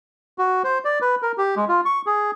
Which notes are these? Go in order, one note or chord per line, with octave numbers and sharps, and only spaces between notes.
F#4
C5
D5
B4
A#4
G4
G#3
F4
C#6
G#4